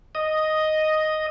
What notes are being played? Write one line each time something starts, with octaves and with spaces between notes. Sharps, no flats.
D#5